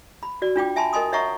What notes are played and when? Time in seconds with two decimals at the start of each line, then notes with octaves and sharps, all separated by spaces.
0.23 B5
0.42 F#4 D5
0.56 D4 F4 G5 D6
0.76 E5 G#5 A5 B5 C6
0.93 A#4 D#5 G#5 C6 D#6
1.12 C#5 D#5 E5 F#5 A#5 C#6